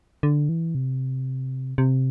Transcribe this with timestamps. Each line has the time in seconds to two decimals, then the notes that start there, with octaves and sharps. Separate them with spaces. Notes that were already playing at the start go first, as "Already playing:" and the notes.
0.23 D3
0.49 E3
0.75 C3
1.78 C3